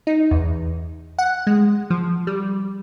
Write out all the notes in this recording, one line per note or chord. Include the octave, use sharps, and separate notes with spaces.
D#4
E2
F#5
G#3
F3
G3